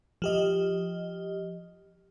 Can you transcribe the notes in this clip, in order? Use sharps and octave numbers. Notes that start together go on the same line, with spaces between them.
F3 G4 D#5